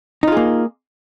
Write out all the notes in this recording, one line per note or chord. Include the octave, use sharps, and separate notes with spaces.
A#3 D#4 F4 G#4